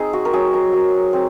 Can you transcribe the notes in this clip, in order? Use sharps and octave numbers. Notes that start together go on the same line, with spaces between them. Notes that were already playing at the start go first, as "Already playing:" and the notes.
Already playing: C4 D#4 G#4
F#4
A#4
F#3 G#4
A#4
F#3
C4